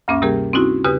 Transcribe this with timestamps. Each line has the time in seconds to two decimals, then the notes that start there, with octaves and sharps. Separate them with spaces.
0.08 D2 G2 A#3 C#4 E5 D6
0.22 C3 G3 A#3 G4 G#4 A#4
0.53 C4 C#4 D#4 E4 F#4
0.84 E2 C#3 G4 B4 D#6 F#6